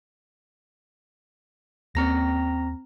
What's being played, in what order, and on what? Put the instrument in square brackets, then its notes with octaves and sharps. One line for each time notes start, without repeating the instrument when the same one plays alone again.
[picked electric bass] D#2 A#3 C#4 [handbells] C4 A#5 A#6